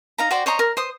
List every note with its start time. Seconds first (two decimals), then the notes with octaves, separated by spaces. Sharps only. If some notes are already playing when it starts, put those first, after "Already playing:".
0.18 D#4 F5 A#5
0.31 F#4 C5 D5 G5
0.46 C5 C#5 D#5 A#5
0.59 A#4
0.77 C5 D#6